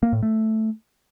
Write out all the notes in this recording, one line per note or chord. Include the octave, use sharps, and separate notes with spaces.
A#3
A2
A3